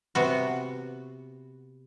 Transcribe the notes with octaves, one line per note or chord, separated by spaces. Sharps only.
C3 B3 F#4